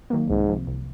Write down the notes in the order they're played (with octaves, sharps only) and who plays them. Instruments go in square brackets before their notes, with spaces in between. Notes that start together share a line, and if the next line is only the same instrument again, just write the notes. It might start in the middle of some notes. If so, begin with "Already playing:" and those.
[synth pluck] D#3 F#3 A#3
[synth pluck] C2 [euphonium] G#2
[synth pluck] C3 F3
C2